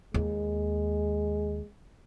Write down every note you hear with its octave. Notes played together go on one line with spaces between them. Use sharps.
D#2 G#3